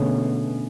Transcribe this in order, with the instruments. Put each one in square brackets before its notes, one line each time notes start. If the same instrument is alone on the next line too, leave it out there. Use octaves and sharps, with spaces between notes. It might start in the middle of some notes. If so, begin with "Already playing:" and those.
Already playing: [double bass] B2 [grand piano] D3 A3 C#4 G#4